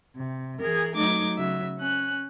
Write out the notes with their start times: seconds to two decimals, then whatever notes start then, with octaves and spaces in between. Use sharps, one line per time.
0.16 C3
0.60 E3 G#4 A#4
0.95 F#3 A3 D#4 D6 G#6
1.37 C#3 F#3 E5
1.78 C#4 F#6